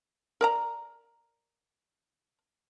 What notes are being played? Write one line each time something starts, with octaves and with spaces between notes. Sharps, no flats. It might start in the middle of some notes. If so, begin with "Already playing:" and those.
A#4 D5 A#5